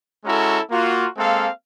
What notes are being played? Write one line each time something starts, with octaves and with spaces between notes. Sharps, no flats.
G#3 C#4 E4 F#4 A4 A#5
A#3 F4 F#4
G#3 A#3 C4 A4 F5